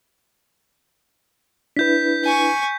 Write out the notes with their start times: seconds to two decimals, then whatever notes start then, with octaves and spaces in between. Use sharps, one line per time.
1.77 D4 E4 B4 G6 B6
2.24 G#5 C#6